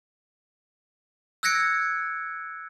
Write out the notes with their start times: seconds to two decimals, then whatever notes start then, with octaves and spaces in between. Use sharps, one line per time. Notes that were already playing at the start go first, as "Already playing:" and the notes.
1.43 E6 F#6 G#6 A#6 C#7 D7